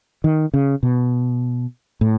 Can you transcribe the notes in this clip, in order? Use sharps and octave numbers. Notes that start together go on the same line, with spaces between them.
D#3
C#3
B2
A2